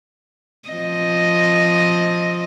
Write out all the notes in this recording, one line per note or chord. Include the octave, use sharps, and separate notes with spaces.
F3 C4 D#5